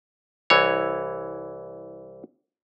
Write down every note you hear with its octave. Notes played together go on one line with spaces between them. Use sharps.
C2 E3 C#5